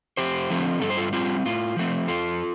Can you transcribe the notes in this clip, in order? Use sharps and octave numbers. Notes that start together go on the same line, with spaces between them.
F2 G4 C5
D3 F3 A3 C4
G2 A4
C5
F4 A4
G3 C4 F4
A2 F4
F3 A3 C4
F2 F4 A4